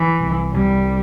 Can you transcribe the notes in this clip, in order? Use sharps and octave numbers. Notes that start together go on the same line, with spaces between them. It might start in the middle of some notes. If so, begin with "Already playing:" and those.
Already playing: E3
C2
C2 G3